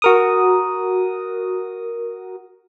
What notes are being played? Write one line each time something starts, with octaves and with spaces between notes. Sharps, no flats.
F#4 A#4 D#6